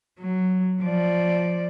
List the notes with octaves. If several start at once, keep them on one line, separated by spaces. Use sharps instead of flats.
F#3
F3 D5